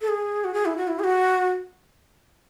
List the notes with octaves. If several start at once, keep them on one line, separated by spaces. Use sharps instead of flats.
A4
G#4
F#4
G#4
E4
F#4
E4
G#4
F#4